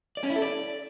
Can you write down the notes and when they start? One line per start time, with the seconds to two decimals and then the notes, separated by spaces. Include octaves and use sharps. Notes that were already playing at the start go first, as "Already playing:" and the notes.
0.17 D5
0.23 C#4
0.30 E4
0.36 A4
0.42 D5